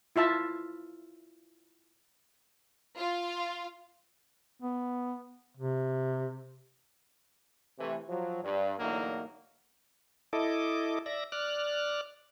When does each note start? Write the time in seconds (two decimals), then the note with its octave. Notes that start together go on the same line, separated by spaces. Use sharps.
0.16 E4 F4 E5 A5
2.97 F4
4.62 B3
5.57 C3
7.79 C3 E3 A3
8.08 F3 F#3
8.43 G2
8.79 E2 A2 D3 F#3 A#3 D#4
10.33 E4 A4 D#5 D6
11.06 D5 E5 A#6
11.32 D5 F6 F#6